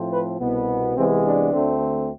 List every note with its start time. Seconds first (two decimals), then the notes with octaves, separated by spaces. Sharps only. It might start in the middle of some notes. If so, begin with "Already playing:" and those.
Already playing: A2 F3 A3 C4
0.12 B4
0.40 C2 B2 B3
0.97 C2 C3 E3 G#3 B3 C4
1.25 D4
1.53 D2 D3 A3 C4